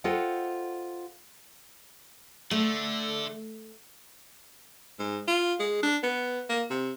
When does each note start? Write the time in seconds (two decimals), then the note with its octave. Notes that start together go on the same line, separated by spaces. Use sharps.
0.04 F4 A4 C5 D#5 F#5 G5
2.51 D3 A3
4.99 G#2
5.28 F4
5.59 G#3
5.83 D4
6.03 B3
6.49 A#3
6.70 C3